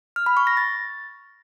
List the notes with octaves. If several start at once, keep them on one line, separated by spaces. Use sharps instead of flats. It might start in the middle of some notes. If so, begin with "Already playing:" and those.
F6
B5
C#6
A#6
A6